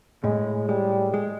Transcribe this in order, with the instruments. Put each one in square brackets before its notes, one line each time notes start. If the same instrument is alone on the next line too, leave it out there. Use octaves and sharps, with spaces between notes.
[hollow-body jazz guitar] A2 [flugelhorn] G#3
[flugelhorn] G3 [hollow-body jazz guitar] G#3
[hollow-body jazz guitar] G#3